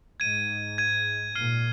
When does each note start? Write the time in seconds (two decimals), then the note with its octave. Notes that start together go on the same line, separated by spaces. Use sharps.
0.20 G#2 G#6 D#7
0.78 G#6 D#7
1.35 A#2 F6 C7 D#7